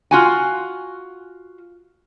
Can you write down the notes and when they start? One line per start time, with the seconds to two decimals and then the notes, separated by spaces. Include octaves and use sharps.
0.11 F4 F#4 G#5